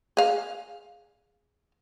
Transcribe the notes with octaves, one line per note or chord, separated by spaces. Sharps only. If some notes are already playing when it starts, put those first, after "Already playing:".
G#4 F5